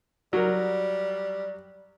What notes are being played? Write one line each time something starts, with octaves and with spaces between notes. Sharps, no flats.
F#3 G3 A#4